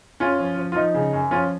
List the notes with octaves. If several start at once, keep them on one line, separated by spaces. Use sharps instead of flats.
F#2 C#4 F4
F3
F3
F4
F3 D#4
C#3
F#2
F3 C#4 F4